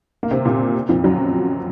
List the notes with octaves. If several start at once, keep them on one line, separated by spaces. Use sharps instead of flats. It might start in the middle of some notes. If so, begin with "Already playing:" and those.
A#3
C3 C4
A#2 A#3
F2 F3
F#2 F#3